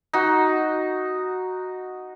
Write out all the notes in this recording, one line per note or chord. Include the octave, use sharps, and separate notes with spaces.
D#4 F#4